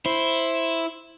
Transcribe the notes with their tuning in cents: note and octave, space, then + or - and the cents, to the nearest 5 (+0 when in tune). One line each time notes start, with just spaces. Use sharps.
E4 +0 C5 +5